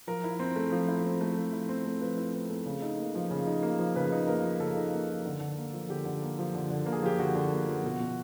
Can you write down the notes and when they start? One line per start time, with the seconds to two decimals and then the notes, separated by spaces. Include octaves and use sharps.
0.07 F3 A#4
0.24 E4
0.40 C4
0.56 A3
0.72 F3
0.89 E4
1.04 C4
1.21 A3
1.37 F3
1.53 E4
1.69 C4
1.85 A3
2.01 F3 B4
2.17 E4
2.33 C4
2.50 A3
2.66 C#3
2.82 D#4
2.98 A#3
3.15 F3
3.31 C#3
3.47 D#4
3.63 A#3
3.79 F3
3.96 C#3 B4
4.12 D#4
4.27 A#3 A#4
4.43 F3
4.60 C#3 A4
4.76 D#4
4.93 A#3
5.09 F3
5.25 D3
5.41 D3
5.57 A#3
5.73 F3
5.89 D3 G4
6.05 D3
6.22 A#3
6.39 F3
6.55 D3
6.70 D3
6.86 A#3
6.92 G#4
7.03 F3 G4
7.19 D3 F#4
7.35 D3
7.51 A#3
7.68 F3
7.84 B2
8.00 B2